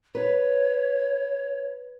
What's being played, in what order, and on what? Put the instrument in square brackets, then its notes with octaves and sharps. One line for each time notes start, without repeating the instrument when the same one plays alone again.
[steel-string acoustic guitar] B4 [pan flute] C#5